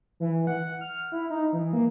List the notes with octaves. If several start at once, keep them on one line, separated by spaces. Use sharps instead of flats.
E3
F#5
F6
E4
D#4
E3
A#3